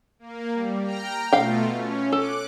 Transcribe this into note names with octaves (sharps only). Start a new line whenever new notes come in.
A#3
G3
G5 A#5 F6
B2 A3 F4 F5 G5
C#4
A4 D6 F#6